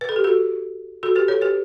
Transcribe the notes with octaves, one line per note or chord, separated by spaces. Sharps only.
B4
A4
G4
F#4 A4
F#4 A4
G4 B4
A4 C#5
G4 B4